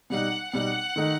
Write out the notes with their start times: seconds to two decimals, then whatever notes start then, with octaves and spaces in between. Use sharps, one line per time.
0.10 B2 G3 D#4 F#5
0.53 B2 G3 D#4 F#5
0.96 D#3 A3 D#4